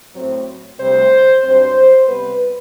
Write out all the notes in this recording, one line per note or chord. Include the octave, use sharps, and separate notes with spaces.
A2 F#3 C4
D2 C3 G3 C4 C5
G2 F#3 C4 C5
C3 G3 B3 B4